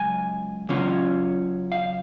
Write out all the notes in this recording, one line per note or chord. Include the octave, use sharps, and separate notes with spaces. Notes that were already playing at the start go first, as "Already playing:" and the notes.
Already playing: C#2 F#3 G#5
C#3 F#3 C#4 F4
F5